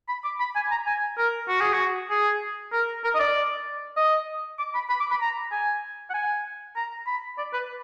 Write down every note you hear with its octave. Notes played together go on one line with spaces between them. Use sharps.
B5
D6
B5
G#5
A#5
G#5
A#4
F#4
G#4
F#4
G#4
A#4
A#4
D#5
D5
D#5
D6
B5
B5
D6
B5
A#5
G#5
F#5
G#5
A#5
B5
D5
B4